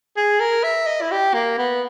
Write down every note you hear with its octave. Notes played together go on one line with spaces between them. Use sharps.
G#4
A#4
E5
D#5
E4
G4
A#3
B3